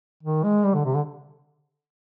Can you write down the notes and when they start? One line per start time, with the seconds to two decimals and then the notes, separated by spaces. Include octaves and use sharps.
0.23 D#3
0.44 G#3
0.65 G3
0.75 D3
0.85 C3
0.95 D3